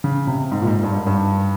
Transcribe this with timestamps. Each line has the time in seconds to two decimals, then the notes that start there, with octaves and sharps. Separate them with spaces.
0.04 C#3
0.27 C3
0.51 G#2
0.62 A#2
0.67 G#2
0.83 G2
0.94 G#2
1.06 G2